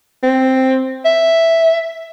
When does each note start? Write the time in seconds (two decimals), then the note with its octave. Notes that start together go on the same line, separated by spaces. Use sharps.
0.23 C4
1.05 E5